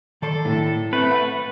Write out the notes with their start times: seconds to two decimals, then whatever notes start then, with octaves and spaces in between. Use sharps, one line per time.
0.22 D#3 A4 D5 C6
0.45 A2
0.93 A3 C4 B4
1.11 E5 F#5